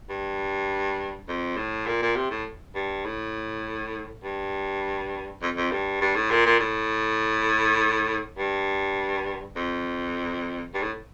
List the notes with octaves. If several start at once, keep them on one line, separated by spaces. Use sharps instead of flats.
G2
F2
A2
A#2
A#2
C3
A2
G2
A2
G2
F2
F2
G2
G2
A2
A#2
A#2
A2
G2
F2
G2
A2